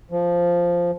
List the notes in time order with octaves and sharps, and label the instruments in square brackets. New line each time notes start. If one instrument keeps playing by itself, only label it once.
[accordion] F3